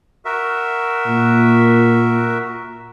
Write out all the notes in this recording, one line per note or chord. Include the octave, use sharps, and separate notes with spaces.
F#4 A#4 E5
A#2